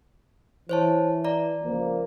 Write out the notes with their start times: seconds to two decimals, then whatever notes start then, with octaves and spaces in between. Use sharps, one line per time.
0.69 E3 C5 C#5 A5
1.24 D5 A#5
1.64 C#2 F3 A#3